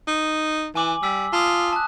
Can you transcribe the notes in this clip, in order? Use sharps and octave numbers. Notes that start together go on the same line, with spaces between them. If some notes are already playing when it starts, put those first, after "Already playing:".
D#4
E3 G#5 D6 F#7
G3 D6 E6 B6
F4 A5 D#6
A5 F#6